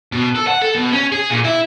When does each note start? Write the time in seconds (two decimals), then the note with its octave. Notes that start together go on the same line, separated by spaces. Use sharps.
0.12 B2
0.35 A4
0.47 F#5
0.62 A4
0.75 B2
0.92 C#4
1.12 G#4
1.30 A#2
1.45 E4